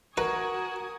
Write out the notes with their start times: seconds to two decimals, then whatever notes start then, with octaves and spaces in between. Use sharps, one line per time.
0.17 F#4 A#4 B4 G#5 C#6 D#6